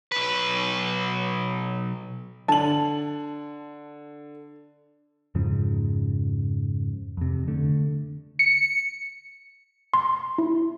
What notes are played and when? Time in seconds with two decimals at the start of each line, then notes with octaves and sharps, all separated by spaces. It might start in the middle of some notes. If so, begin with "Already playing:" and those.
0.12 B1 B4
2.48 D3 A5 F#7
5.35 F2 G#2 C#3 F3
7.17 F2 C3
7.48 D3 A3
8.39 C#7
9.94 C6
10.38 E4